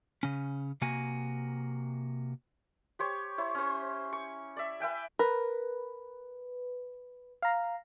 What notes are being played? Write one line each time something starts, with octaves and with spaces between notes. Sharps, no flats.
C#3 C#4
C3 A#3 F#4 G#5
G4 C5 C#5
E4 C5 C#5
C#4 C5
C#6
D5 E5
B4 E5 G5 G#5
A#4 B4
F5 A#5